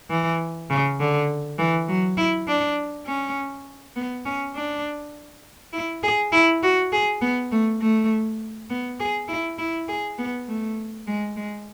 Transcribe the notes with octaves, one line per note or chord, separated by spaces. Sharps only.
E3
C#3
D3
E3
F#3
E4
D4
C#4
B3
C#4
D4
E4
G#4
E4
F#4
G#4
B3
A3
A3
B3
G#4
E4
E4
G#4
B3
A3
G#3
G#3